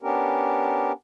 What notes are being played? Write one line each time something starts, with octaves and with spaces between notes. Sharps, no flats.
B3 C#4 D4 G4 A#4